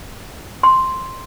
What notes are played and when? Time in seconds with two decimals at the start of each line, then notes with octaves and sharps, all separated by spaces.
0.63 C6